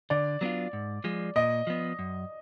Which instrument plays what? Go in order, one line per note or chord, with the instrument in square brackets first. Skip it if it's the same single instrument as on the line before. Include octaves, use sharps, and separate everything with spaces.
[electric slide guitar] D3 [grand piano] D5
[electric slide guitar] F#3 B3 D4 F4
G#2
F3 G#3
[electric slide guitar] A#2 [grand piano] D#5
[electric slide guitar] F3 B3
F#2